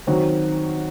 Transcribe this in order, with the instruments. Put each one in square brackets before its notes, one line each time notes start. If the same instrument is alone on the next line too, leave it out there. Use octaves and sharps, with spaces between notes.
[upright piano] D#3 F#3 C4 F#4